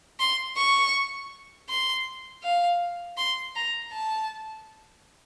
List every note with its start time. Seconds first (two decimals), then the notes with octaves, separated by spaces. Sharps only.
0.20 C6
0.57 C#6
1.69 C6
2.43 F5
3.17 C6
3.56 A#5
3.92 A5